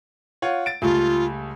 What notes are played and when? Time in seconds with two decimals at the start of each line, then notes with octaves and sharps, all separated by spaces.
0.42 F4 C#5 F#5
0.66 A6 D7
0.82 C#2 G3 A3 F4